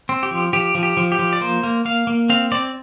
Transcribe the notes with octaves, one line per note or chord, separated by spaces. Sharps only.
C4
G4
F3
F3 G4
F3
G4
F3
G4
F3
D5
A#3 C5
A#3
A#3 F5
A#3
C4 F5
C4 D5